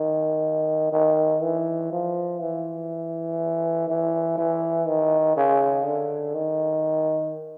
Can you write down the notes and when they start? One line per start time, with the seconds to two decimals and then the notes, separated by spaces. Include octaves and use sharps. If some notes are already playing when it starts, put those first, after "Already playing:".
Already playing: D#3
0.92 D#3
1.42 E3
1.92 F3
2.40 E3
3.88 E3
4.37 E3
4.87 D#3
5.36 C#3
5.85 D3
6.34 D#3